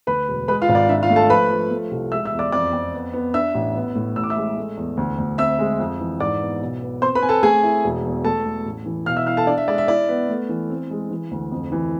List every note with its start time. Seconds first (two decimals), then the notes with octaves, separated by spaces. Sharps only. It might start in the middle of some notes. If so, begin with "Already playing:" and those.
0.07 D2 B4 B5
0.28 E1
0.48 G#3 B4 B5
0.62 F4 F5
0.69 G#1
0.75 D5
0.89 D4 E5
1.03 F4 F5
1.10 A3
1.16 A4 A5
1.29 F3 B4 B5
1.50 F3
1.71 A3
1.91 C2
2.12 G#3 E5 E6
2.25 E5 E6
2.32 E2
2.39 D5 D6
2.52 F2 D5 D6
2.73 F2
2.93 B3
3.13 B3
3.34 D4 E5 E6
3.55 A1
3.75 B3
3.95 A2
4.16 A1 E6
4.23 D6
4.30 E5 E6
4.37 G#3
4.57 A3
4.77 E2
4.97 D2
5.18 D2
5.38 C4 E5 E6
5.59 G#3
5.79 F2
6.00 E3
6.20 G#2 D5 D6
6.41 B3
6.61 B1
6.82 B3
7.02 C4 C5 C6
7.15 B4 B5
7.22 C4 G#5
7.29 A4 A5
7.43 A3 G#4 G#5
7.63 E4
7.84 E1
8.04 E2
8.25 A3 A4 A5
8.45 A3
8.66 A1
8.86 E3
9.06 B2 F5 F6
9.17 E5 E6
9.26 E4 F5 F6
9.37 A4 A5
9.47 D4 D5
9.58 E5
9.68 G#3 D5
9.78 E5
9.88 E4 D5
10.09 B3
10.29 A3
10.49 E3
10.70 C4
10.91 G#3
11.11 E3
11.31 D2
11.51 F2
11.72 E3